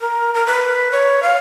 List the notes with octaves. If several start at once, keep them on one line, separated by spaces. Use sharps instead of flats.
A#4
A#4
B4
C#5
F5